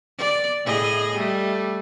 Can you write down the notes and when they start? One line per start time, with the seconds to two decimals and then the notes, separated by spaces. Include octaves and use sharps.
0.18 D5
0.65 A2 G#4 D#5
1.15 G3 A3